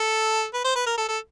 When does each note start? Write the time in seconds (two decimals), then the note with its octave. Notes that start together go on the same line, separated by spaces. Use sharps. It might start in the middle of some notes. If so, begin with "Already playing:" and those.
Already playing: A4
0.53 B4
0.64 C5
0.75 B4
0.86 A#4
0.97 A4
1.08 A4